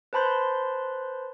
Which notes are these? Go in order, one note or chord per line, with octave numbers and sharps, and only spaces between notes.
B4 C5 A5 B5 C6 G6